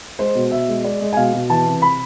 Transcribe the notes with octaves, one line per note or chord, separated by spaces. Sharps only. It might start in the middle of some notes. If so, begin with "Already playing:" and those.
G#3 C5
B2
B2 E5
G#3
G#3 D5
G#3
G#5
B2 F5
B2
E3 A5
C3
B5